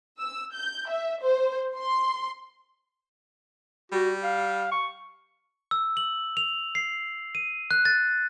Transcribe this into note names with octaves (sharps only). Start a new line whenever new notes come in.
E6
G6
E5
C5
C6
G3 F#4
F5
C#6
E6
F#7
F7
C7
D#7
F#6
A6